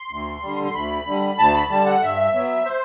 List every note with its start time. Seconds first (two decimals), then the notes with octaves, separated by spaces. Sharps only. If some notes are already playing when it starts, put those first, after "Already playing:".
Already playing: C6
0.11 D2
0.42 D3 G3
0.64 C6
0.74 D2 B5
1.06 D3 G3
1.38 D2 A5
1.54 B5
1.70 D3 G3 A5
1.86 F#5
2.02 G2 E5
2.34 F#3 B3
2.66 C5